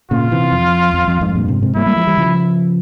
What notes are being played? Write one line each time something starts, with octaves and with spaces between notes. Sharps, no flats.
A#2 C#3 F4
C3 E3
F2
F2
F2
F2 G#2
G2 A#2
G#2 C3
G#2 C3
G3 A#3 E4
G3 A#3
F3 G#3
E3 G3
C#3 F3